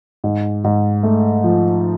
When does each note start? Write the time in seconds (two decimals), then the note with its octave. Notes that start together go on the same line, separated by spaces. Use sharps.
0.24 G#2
0.64 G#2
1.03 A3
1.44 F3